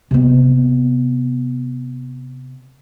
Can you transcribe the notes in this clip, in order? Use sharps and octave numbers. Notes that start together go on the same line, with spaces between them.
C3 B3